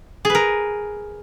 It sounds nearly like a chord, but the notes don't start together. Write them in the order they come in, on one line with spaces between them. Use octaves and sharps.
G#4 B4 A#4